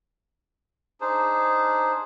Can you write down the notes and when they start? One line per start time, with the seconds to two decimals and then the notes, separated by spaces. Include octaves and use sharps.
1.01 D4 D#4 G#4 C5